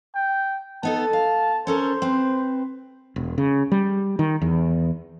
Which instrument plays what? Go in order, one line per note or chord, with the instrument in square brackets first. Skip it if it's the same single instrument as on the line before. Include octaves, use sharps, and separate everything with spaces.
[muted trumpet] G5
[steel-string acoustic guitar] B3 D#4 A4 [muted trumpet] A5
[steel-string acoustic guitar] F5
[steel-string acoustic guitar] C#4 A4 A#4 [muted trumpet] C5
[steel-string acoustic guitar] C4 B4
[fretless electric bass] E1
C#3
G3
D#3
E2